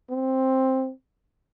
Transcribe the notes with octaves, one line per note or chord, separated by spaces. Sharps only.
C4